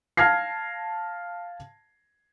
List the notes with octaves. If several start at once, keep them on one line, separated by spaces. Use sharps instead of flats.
F5 A5 F6 G#6 A#6 C7